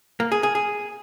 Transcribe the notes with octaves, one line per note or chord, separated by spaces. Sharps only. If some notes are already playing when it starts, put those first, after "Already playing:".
A#3
G#4
G#4
G#4